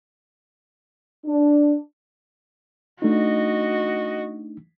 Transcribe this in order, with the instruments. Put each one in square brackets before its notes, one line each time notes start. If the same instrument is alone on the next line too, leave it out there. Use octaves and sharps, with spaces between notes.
[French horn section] D4
[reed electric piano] A3 D4 D#4 [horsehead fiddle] F#4 D#5